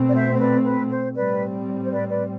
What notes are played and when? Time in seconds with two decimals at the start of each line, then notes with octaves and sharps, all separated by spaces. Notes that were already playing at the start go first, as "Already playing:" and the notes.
Already playing: B2 A3 C4
0.08 D5
0.15 C5 E5
0.35 C5
0.40 B4 D5
0.65 B4
0.91 C5
1.16 A2 G3 C4 B4 D5
1.84 C5
1.91 B4 D5
2.10 B4 D5